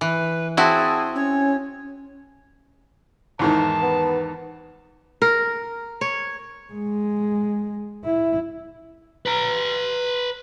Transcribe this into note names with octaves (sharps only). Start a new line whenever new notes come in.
E3 B4
C4 E4 F#4 G#4 A5
C#4 C#5
E2 G#2 D#3 A5
B3
A#4
C#5
G#3
E4
B4 A#5